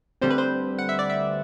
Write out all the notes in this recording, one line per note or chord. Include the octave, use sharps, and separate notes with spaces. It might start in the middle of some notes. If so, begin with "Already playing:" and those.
D2 D3 G3 C4 C5
B4
C5
F#5
E5
D5
E5